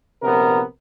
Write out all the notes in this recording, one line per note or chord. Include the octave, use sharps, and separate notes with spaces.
A#1 C3 B3 A#4